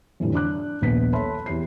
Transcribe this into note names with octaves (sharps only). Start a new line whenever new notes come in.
F2 A2 D3 E3 G3
D4 D6 F#6
D#1 A#1 B3 B6
A4 C#5 E5 A5 B5 C6
E2 G4 C7